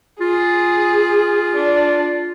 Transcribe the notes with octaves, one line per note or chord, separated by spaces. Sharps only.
F4 G#4
D4